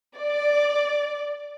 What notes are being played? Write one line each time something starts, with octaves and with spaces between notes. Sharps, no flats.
D5